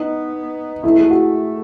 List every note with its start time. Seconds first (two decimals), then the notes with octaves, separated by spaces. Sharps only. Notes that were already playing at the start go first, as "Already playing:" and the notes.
Already playing: B3 D#4
0.83 A3 E4
0.98 G#4
1.10 F#4